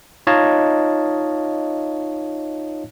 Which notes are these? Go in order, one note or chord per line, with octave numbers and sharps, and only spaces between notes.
D#4 F4 C#5 D#5 F5 A5